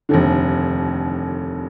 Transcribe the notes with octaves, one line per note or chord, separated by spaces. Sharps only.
F1 D#2 D3